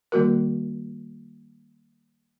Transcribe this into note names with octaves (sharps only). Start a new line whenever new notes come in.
D#3 G3 A#3 F#4 A#4